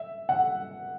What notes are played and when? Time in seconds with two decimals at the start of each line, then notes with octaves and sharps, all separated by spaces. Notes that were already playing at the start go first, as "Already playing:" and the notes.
Already playing: E5
0.29 F#5